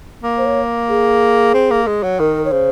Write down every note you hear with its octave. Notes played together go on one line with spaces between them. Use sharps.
A#3
C5
C#5
G#4
C4
A#3
G#3
F#3
D#3 A#4
C#5
C#3 C5